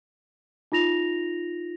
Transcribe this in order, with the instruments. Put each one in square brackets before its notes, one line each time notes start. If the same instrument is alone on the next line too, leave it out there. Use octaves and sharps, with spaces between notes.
[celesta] D#4 F4 A#6 F7